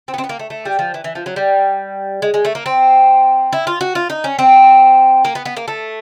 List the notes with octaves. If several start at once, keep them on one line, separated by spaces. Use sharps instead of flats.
C4
B3
C4
B3
A#3
A3
A3
G3
F3
E3
E3
F3
F#3
G3
G#3
G#3
A3
A#3
C4
E4
F4
F#4
F4
D#4
C#4
C4
A#3
B3
B3
A#3
A3